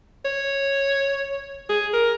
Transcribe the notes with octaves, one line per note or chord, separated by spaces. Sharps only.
C#5
G#4
A#4